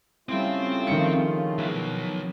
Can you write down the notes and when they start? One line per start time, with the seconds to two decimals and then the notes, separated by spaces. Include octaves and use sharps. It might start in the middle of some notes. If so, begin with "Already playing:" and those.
0.29 C#3 G3 A3 C4 E4 F4 G5
0.87 D#3 F3 G3 C#4 C#7
1.59 F#3 B3 G#4